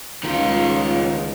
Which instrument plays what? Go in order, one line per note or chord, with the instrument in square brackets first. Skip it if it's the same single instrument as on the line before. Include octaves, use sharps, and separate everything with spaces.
[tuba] C#2 [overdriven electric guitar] D#3 F4